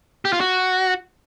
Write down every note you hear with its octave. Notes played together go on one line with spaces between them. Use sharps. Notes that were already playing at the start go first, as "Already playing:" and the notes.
G4
F4
F#4